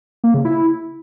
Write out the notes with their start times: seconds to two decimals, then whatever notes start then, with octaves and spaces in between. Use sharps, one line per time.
0.24 A#3
0.34 C#3
0.45 E4